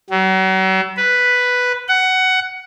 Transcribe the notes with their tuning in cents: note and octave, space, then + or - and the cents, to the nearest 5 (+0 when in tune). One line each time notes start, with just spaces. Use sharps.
F#3 +40
B4 +0
F#5 +15